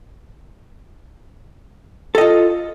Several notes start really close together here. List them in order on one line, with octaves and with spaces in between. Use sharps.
A4 D#5 F4